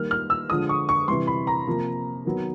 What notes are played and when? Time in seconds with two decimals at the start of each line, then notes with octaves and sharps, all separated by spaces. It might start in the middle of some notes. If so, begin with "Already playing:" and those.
Already playing: D#3 G3 A#3 F6
0.11 F6
0.30 E6
0.50 D3 F3 G#3 D#6
0.69 C#6
0.89 C#6
1.08 C3 E3 G3 C6
1.27 B5
1.47 A#5
1.67 C3 F3 A#3
2.25 D#3 F#3 B3